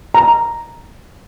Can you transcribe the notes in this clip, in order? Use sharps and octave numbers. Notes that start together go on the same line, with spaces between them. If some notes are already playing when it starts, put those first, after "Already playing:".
A#5